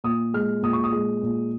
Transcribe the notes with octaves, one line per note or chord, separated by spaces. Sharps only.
A#2 D#6
G#3 F6
A#2 D#6
C#6
D#6
G#3
A#2